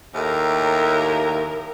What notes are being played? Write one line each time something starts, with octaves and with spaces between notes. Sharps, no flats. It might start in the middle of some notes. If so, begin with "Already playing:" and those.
D#2 A2 A#4